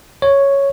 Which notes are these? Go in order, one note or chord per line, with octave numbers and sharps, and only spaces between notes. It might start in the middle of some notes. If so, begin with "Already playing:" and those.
C#5